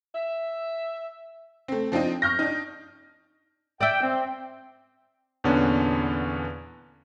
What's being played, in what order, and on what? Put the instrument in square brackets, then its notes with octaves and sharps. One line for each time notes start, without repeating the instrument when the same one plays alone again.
[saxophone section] E5
[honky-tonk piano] A3 C4
F3 C4 D4 D#4
C#6 F6 G6 A#6
D4 D#4
[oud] D5 E5 [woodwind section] G5
[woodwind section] C4
[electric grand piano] E2 A#2 D3 B3 C#4 D4